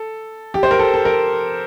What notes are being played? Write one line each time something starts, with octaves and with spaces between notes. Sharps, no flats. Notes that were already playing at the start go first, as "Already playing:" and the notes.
Already playing: A4
G4
C5
A#4
A4
A4
A#4